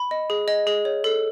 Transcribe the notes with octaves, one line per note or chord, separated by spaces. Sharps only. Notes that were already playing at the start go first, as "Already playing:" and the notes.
Already playing: B5
D#5
G#4
D#5
G#4
C#5
A4